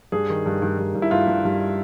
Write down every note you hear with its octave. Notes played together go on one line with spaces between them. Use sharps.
G2 G#4
D#3
G2
G2
G2
G2
E4
G2 F4
G2
G2